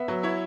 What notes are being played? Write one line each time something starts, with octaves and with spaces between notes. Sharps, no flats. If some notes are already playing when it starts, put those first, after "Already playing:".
Already playing: B3 E5
F#3
E4 C#5